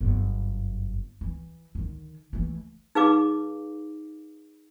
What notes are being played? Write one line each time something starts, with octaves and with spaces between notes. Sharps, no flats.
G1 F#2
E3
D3 D#3
E3 A3
D#4 G#4 B4 F5 D6